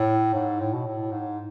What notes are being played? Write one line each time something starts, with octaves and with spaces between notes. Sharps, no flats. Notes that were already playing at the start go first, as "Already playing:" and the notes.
Already playing: A2
G#2
A2
B2
A2
G#2